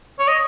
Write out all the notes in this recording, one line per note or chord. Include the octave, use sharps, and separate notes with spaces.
C#5
D#5